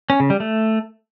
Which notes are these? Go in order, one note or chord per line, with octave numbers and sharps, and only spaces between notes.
C#4
C#3
G3
A3